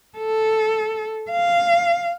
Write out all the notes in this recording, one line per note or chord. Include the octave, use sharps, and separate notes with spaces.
A4
F5